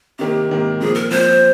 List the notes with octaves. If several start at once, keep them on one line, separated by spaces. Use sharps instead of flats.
C3 D#3 A#3 G4
C3 D#3 A#3
A#2 F3 C4 G#4
A#4
A#2 F3 C4 C5